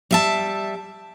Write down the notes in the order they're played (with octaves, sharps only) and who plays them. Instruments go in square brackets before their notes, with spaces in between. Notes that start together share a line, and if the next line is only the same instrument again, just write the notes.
[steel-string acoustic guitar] G3 E5 A5